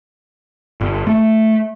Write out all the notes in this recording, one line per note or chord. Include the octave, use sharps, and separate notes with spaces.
G1
A3